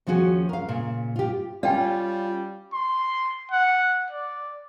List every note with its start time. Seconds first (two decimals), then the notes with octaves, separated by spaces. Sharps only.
0.07 D#2 F3 C#4 F#4 G#4
0.49 A#4 F5
0.69 A#2 C#3
1.16 F4 G4
1.63 G3 C#4 F4 D5 G5 G#5
2.73 C6
3.51 F#5
4.11 D5